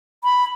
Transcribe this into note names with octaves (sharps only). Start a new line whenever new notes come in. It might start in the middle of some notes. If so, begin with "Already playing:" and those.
B5